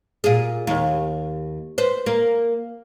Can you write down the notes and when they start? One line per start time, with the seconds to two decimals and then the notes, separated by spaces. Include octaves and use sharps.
0.24 A#2 G#4
0.67 D#2
1.78 B4 C5
2.06 A#3